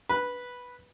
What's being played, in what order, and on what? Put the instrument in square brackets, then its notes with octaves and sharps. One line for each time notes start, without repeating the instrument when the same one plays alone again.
[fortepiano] B4